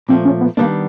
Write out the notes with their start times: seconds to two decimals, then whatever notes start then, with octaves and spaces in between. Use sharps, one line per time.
0.09 A#2 F3 A3 C4
0.25 C#4
0.41 B3
0.57 D#3 G3 A#3 B3 D4